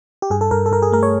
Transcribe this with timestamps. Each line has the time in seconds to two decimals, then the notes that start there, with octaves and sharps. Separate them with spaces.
0.22 G4
0.30 G2 G#4
0.41 A4
0.51 G2 A#4
0.66 A4
0.72 G2 A#4
0.82 G#4
0.92 A3 A#4
1.03 C#5